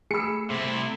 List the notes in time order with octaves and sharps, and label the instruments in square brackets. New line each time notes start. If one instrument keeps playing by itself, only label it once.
[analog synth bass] A3 [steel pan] G#4 B5 [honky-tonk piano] E6 C#7
[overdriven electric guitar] C3 E4 [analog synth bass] A3